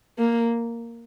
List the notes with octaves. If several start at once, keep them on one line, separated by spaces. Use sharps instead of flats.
A#3